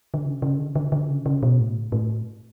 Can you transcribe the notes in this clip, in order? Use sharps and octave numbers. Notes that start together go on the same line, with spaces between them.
D3
C#3
C#3
D3
D3
D3
C#3
C#3
B2
A2
A2